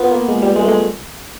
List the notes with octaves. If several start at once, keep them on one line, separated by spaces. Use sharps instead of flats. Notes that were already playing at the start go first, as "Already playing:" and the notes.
Already playing: B3 F4
A#3
G#3
G3
G#3
A3
G#3